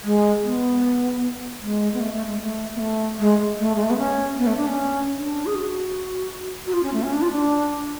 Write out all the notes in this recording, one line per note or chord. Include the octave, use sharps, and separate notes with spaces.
G#3
B3
G#3
B3
A3
A3
G#3
A3
B3
A3
G#3
A3
G#3
A3
B3
C#4
B3
A3
D4
C#4
D4
G#4
F#4
F#4
F4
C#4
A3
C#4
D4
F4
D4